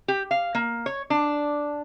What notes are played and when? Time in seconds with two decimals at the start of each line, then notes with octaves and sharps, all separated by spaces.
0.08 G4
0.31 F5
0.55 A#3
0.86 C#5
1.10 D4